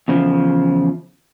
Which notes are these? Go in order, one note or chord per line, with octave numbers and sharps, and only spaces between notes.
E2 C#3 F3